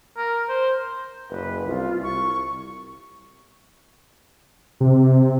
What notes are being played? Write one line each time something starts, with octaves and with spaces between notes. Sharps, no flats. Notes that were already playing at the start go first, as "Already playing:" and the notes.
A#4
C5
F#1 B4
C2 F4
C2 C#6
C3